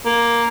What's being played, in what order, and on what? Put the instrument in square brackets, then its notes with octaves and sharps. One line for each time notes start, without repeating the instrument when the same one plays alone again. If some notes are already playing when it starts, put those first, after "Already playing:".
[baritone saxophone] A#3